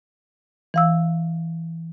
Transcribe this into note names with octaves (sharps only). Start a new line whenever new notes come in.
E3 F5 E6